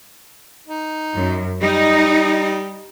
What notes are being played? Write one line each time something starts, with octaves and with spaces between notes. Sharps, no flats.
D#4
F#2
G3 D#4